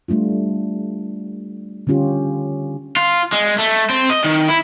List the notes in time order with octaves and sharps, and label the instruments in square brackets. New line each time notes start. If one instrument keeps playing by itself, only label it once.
[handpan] G3 A3 D4 F4
D3 G3 C#4 F4 G4
[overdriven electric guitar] F4
G#3
A3
C4
D#5
D#3
E4